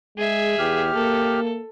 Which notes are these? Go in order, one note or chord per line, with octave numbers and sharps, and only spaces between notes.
G#3 G#4 E5
E2 G4 F6
A#3 A4